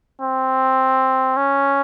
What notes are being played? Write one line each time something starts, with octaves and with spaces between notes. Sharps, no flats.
C4
C#4